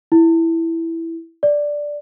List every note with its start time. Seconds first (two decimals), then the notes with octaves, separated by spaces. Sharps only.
0.12 E4
1.43 D5